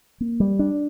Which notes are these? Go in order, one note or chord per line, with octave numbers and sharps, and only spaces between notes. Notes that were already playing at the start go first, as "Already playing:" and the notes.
A#3
G3
D4